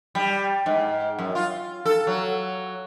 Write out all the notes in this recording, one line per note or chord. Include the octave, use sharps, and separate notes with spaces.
G3
G#2
F#2
F4
A4
F#3